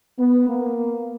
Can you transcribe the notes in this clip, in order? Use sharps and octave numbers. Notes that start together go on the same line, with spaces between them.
B3
A#3